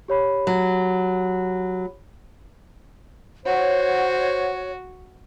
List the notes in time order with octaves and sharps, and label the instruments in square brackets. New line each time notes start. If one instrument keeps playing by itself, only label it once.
[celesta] G4 C#5 B5
[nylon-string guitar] F#3
[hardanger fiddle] F#4 [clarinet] C5 [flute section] C#5 F#5